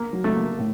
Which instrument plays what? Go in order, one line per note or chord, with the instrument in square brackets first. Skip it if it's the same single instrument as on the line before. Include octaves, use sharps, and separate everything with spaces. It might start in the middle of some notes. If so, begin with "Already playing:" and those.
Already playing: [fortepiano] A#3
[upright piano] F#3
[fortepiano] A3
[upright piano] A#3
A2